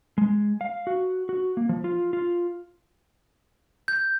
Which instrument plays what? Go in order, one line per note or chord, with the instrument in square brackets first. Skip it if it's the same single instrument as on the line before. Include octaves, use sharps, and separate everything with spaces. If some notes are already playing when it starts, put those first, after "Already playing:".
[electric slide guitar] G#3
F5
F#4
F#4
A#3
F3
F4
F4
[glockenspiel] G6